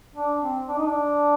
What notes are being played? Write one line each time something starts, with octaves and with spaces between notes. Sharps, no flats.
D4
C4
D4
D#4
D4